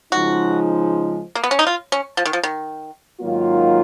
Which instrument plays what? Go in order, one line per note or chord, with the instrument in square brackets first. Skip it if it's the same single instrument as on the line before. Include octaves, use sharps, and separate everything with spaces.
[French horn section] C#3 F3 G#3 D#4 [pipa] F#4
[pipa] A#3
B3
C#4
D#4
F4
C#4
F3
D#3
F3
D#3
[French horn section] G#2 D#3 F#3 A#3 F4